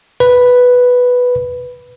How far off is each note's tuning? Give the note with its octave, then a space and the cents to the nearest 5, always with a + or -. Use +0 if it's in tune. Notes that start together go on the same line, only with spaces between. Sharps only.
B4 +0